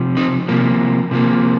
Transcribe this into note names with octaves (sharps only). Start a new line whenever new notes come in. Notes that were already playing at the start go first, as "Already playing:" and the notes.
Already playing: C3 F3
C4 D#4
C3 F3 A#3
C3 F3 A#3